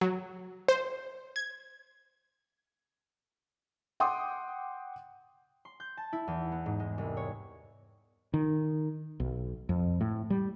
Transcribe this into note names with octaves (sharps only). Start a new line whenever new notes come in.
F#3
C5
G#6
F#5 G5 C6 D6 D#6
C6
G6
A5
E4
E2
B3
G#2
G#3
C2
C#5
D#3
B1
F2
A2
G3